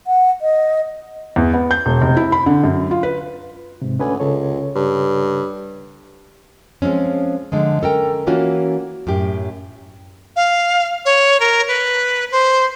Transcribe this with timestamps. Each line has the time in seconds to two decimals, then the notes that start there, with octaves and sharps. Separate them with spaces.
0.07 F#5
0.42 D#5
1.36 E2
1.54 B3
1.71 G6
1.86 E1
2.02 F1
2.17 E4
2.32 B5
2.46 D3
2.64 F#2
2.91 F4
3.03 B4
3.82 G#2 C3
3.99 D2 C#4 B4 G#5
4.20 C#2 C#3 A4 C#5
4.75 G2
6.82 F3 G#3 C4 C#4
7.52 D3 F3 G#3
7.82 C#4 A4 A#4 G5
8.27 E3 A#3 C#4 F4 F#4
9.07 F#2 A2 G4
10.36 F5
11.05 C#5
11.40 A#4
11.68 B4
12.32 C5